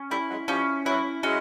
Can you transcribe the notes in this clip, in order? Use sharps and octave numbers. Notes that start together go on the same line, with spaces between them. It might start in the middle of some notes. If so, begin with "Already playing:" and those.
Already playing: C#4
G3 A3 E4
F#3 G#3
F3 G3 C#4
E3 F#3 E4
F#3 G#3 C#4